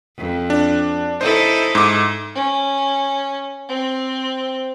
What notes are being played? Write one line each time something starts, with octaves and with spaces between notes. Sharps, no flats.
F2
D4
D#4 E4 A4 C5
G#2 D6
C#4
C4